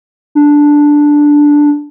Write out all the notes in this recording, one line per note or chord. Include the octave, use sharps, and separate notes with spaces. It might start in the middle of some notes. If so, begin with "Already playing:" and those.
D4